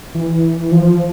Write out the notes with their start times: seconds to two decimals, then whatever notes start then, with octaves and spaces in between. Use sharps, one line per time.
0.15 E3
0.72 F3